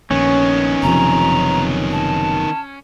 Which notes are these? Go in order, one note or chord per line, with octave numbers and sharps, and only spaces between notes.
A#1 D#3 B3 C#4
F#1 C3 F3 A#5
A5